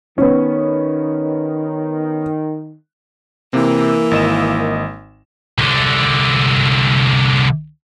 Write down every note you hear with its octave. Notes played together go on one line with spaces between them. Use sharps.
D#3 B3 C#4
C3 E3 A#3 C4
G#1 D#5 E7
C2 D3